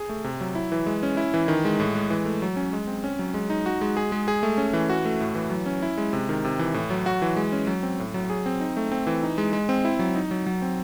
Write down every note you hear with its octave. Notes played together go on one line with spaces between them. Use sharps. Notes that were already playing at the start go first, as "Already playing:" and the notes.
Already playing: G#4
A3
C3
F#3
E4
E3
G#3
C#4
E4
E3
D#3
G#3
A2
G#3
E3
A3
F#3
C#4
G#3
C4
C#4
F#3
G#3
D#4
F#4
G#3
G#4
G#3
G#4
A3
C#4
E3
F#4
A3
A2
E3
F#3
C#4
E4
G#3
C3
D#3
C3
E3
A2
F#3
F#4
E3
G#3
C#4
F#3
C4
A2
F#3
G#4
C4
D#4
A3
C4
E3
D#4
G#3
G#3
C4
E4
F#3
D#4
F#3
F#3
C4